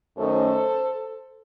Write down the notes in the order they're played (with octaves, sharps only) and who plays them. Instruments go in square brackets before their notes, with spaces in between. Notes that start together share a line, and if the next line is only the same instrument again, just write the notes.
[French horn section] F#2 D#3 A3 C#4 A4 C5